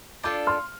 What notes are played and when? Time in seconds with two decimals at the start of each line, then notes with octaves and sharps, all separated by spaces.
0.24 D4 F4 A4 D5 D6 G6
0.47 C6 F6